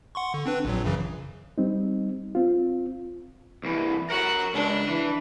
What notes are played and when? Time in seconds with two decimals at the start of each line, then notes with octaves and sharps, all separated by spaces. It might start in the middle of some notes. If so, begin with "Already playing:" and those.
0.15 F#5 C6 C#6
0.34 D3
0.46 C4 D4 B4
0.65 A#1 A#2 F#3
0.84 F#2 C#3 E3
1.58 G3 C4 D#4
2.35 C4 F4
3.64 C2 E3
4.10 F#4 A#4 C#5 F#5
4.54 C#2 D4
4.89 E3